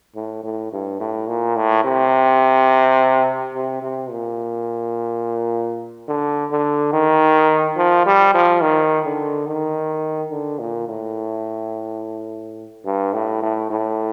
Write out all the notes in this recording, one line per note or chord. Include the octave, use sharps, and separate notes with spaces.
A2
A2
G2
A2
A#2
A2
C3
C3
C3
A#2
D3
D3
D#3
F3
G3
F3
D#3
D3
D#3
D3
A#2
A2
G2
A2
A2
A2